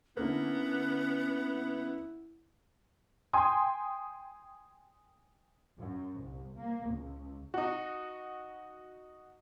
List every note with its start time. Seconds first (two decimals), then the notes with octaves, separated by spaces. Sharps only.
0.17 D3 A#3 B3 C#4 E4
3.33 G5 G#5 C6 D#6
5.77 F#2
6.17 C2
6.55 A#3
6.87 C#2
7.54 D#4 F#4